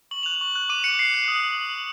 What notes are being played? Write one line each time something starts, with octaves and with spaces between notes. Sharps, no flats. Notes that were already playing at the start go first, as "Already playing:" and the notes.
C#6 F#7
F#6 F7
F#7
C#6
F#6
D6 D#7
F#6 C#7
D6 C7
F#6
D#6